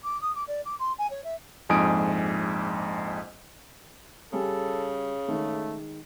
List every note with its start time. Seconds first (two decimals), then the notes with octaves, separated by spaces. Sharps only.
0.04 D6
0.21 D#6
0.35 D6
0.47 D5
0.65 D6
0.79 C6
0.98 G#5
1.10 C#5
1.24 E5
1.69 A#1 F2 G#2 G#5 D#6 D7
4.33 C#3 G3 A4 G#5
5.28 D#3 G#3 A3